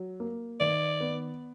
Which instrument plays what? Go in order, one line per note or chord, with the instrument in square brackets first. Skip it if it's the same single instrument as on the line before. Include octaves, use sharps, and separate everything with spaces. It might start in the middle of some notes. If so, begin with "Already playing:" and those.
Already playing: [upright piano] F#3
A#3
[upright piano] D#3 [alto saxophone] D5
[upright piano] B3